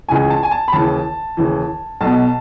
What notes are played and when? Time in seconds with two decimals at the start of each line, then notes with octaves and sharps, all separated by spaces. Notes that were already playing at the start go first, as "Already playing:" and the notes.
0.08 C#2 C#3 E3 G#5
0.30 A5
0.43 G#5
0.51 A5
0.68 B5
0.72 D#2 C#3 E3 A5
1.37 D#2 C#3 E3
2.01 B1 B2 A5